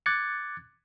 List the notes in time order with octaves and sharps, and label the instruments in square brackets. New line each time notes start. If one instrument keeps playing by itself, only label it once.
[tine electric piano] D6 F#6 G#6 A6 C#7